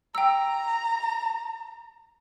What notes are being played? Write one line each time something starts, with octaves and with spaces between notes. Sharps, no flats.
G5 A#5 E6